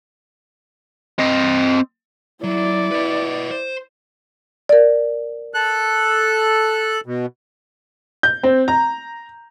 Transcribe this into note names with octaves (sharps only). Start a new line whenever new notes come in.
C4 D#5
F#3 E4 D5
B4 D#5
C5
A#4 D5
A4 F#6
B2
G6
C4
A#5